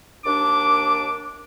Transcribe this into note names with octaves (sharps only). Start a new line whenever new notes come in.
D#2 D4 D6